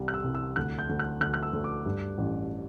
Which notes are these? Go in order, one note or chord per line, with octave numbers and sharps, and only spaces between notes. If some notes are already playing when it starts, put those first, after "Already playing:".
Already playing: C2 G3
F#6
E6
C2
E6
D2 F#6
G6
D2
F#6
D2 F#6
F#6
E6
D2
D6
G2
A1